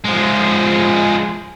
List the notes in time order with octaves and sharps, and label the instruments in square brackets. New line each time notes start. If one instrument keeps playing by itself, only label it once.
[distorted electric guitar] F3 G#3